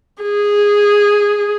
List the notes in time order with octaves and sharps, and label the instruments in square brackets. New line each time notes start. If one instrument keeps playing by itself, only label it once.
[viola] G#4